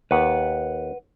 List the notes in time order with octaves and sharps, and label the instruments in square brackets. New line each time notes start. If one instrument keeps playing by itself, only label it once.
[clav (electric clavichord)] D#2 [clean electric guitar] B4 F#5